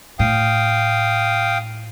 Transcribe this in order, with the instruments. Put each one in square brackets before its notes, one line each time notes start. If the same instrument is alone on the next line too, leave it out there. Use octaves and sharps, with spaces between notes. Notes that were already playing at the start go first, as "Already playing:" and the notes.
[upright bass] A2 [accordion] F5 G5 D#6